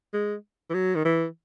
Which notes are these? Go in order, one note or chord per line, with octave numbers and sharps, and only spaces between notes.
G#3
E3
F#3
D#3
E3